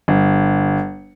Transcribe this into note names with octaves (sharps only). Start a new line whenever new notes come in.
G1